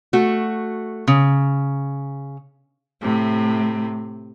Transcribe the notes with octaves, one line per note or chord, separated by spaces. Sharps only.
A3 F#4
C#3
A2 C3